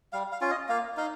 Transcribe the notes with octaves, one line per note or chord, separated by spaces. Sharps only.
G3 F5
F5
C#4 F4
D#5
A#3 F5
D#4 F5